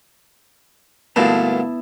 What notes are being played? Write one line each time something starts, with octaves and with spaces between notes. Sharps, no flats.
D2 G2 A#2 B3 E4 A5